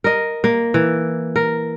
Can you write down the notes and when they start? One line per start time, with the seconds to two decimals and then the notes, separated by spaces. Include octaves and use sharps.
0.04 A#4 D#5
0.44 A#3
0.74 E3
1.36 A#4